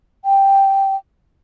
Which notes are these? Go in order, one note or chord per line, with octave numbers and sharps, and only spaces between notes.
G5